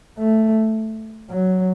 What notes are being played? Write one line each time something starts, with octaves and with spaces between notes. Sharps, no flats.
A3
F#3